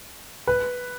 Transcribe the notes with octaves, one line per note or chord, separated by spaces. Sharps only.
B4